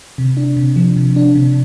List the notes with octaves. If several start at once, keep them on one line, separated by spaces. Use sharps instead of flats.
C3
D4
C3
F3
C3
D4
C3